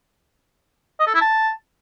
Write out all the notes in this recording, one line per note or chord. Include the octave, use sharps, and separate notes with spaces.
D#5
A4
E4
A5